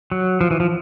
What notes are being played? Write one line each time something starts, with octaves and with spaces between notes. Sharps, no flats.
F#3
F3
E3
F3